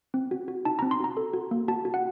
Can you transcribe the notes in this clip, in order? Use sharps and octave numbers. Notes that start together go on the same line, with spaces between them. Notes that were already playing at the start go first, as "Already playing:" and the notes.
C4
F#4
F#4
D#4 A5
C4 A#5
C6
F#4 A#5
A4
F#4
A#3
F#4 A5
F#4
F#5